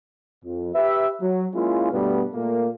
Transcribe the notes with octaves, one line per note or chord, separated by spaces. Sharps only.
F2
G4 B4 E5
F#3
G#3 A#3 C#4 E4 F4
G2 B2 G3 A3 B3
A#2 A3 A#3